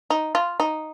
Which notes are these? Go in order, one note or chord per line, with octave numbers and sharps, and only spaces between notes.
D#4
F4
D#4